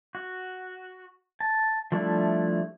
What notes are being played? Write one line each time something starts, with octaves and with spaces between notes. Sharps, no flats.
F#4
A5
F3 G3 A3 D4 E4